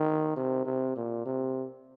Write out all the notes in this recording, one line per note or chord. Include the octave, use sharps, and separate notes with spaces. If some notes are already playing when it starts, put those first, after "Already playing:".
Already playing: D#3
C3
C3
A#2
C3